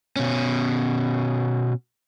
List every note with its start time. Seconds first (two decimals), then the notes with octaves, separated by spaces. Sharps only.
0.16 B2 C#4